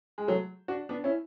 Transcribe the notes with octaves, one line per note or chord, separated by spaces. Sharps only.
G#3
F#3 A3
D4 F#4
B3 D4
C#4 E4